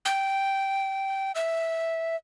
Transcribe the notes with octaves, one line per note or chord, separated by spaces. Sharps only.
G5
E5